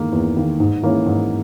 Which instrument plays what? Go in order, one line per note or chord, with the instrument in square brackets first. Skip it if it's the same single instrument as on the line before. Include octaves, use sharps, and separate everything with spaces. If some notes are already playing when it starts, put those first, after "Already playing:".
Already playing: [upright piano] E2 D#3 A#3
E2
D#3 A#3
G#2
E3 A#3 C#4
G#2